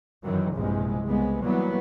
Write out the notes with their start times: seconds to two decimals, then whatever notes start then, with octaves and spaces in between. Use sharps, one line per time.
0.24 F#2 D#3 E3 F#3
0.53 A#1 E2 G2 C3 G#3
1.05 C2 C#3 G#3 B3
1.42 E3 F#3 G3 A#3 B3